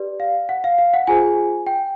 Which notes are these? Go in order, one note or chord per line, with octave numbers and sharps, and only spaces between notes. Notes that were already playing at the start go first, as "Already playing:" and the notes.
Already playing: G4 B4 D5
F5
F#5
F5
F5
F#5
F4 G#4 C5 G#5
G5